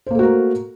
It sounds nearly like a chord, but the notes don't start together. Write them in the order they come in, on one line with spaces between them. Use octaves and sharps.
C5 A#3 A3 F#4 A#4